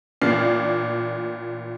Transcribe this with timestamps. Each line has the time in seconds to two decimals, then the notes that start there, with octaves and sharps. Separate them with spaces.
0.22 A1 A#2 D4 F6 C7